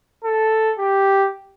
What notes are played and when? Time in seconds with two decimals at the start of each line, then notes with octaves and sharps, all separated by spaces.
0.24 A4
0.78 G4